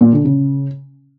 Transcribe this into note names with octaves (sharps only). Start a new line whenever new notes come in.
A#2
D3
C#3